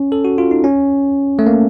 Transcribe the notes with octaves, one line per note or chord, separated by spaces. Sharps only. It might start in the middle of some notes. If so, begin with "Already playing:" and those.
Already playing: C#4
A4
F#4
F4
D#4
C#4
A3
A#3